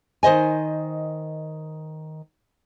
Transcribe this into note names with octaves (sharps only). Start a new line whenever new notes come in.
D#3 C5 D#5 G#5